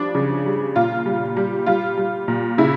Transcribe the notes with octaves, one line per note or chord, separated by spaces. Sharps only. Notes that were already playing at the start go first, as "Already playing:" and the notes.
Already playing: F3 G3 D4
C#3
G3
A#2 F4
G3
G3
G3 F4
G3
A#2
C#3 E4